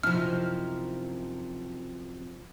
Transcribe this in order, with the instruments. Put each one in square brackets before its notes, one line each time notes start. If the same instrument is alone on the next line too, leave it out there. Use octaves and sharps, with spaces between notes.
[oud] F#2 C3 [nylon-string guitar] F3 D#4 E4 [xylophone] F6